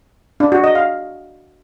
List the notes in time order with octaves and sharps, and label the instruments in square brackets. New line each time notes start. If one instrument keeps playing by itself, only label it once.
[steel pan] D4
F#4
D#5
F5